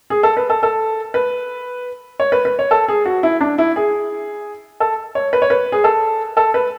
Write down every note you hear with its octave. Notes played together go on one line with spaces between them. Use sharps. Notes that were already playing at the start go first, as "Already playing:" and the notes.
G#4
A4
B4
A4
A4
B4
C#5
B4
B4
C#5
A4
G#4
F#4
E4
D4
E4
G#4
A4
C#5
B4
C#5
B4
G#4
A4
A4
B4